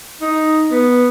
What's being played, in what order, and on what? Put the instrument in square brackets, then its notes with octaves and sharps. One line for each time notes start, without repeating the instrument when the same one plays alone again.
[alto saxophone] D#4
B3